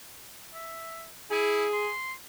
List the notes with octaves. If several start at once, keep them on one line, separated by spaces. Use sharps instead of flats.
E5
E4 G#4
C6